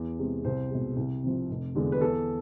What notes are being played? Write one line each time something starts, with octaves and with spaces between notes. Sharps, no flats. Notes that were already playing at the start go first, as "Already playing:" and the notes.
Already playing: E2
C3 G#3
C2 C5
B2 G#3
C2
C3 F3
F1
E2 D3 G#3
B4
E2 A4